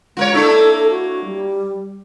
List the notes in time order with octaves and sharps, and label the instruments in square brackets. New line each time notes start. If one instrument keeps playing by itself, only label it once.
[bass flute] G#3 [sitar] F4 A#4 C#5
[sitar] A#3 D4 E4 [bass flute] A4
[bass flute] F#4
G3